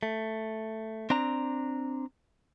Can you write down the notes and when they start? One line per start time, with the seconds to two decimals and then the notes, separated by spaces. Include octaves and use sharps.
0.03 A3
1.10 C4 D4 A#5